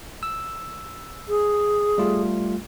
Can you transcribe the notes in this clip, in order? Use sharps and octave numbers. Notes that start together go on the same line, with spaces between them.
E6
G#4
G3 A3 F4